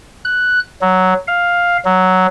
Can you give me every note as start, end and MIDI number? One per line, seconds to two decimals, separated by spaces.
0.25 0.60 90
0.81 1.14 54
1.28 1.77 77
1.85 2.27 54